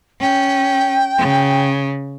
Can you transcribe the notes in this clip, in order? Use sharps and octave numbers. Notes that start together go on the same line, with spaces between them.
C#4 G5
C#3